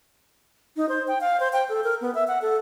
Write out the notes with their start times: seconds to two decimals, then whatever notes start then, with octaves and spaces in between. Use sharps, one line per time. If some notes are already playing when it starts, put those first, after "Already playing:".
0.77 D#4
0.89 C5
1.08 G5
1.21 F5
1.40 C5
1.53 G5
1.69 A4
1.84 A#4
2.01 B3
2.15 E5
2.28 F#5
2.42 A4